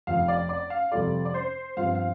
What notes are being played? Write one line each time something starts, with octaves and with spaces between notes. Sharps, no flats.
F1 F2 F3 F5
D5
D5
F5
F2 C3 G3 F4 A4 D5
D5
C5
G2 F3 C4 F4 F5
F5